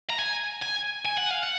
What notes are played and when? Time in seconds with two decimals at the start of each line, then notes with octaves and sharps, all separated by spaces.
0.10 A#5
0.19 G#5
0.62 G#5
1.05 G#5
1.17 F#5
1.31 F5
1.43 F#5